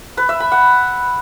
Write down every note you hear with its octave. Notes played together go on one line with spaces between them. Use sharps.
B4
E5
B5
F#5